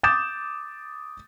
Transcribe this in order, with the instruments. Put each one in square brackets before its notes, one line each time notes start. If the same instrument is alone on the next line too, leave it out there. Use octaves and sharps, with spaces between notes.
[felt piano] D6 D#6 G6 A6 E7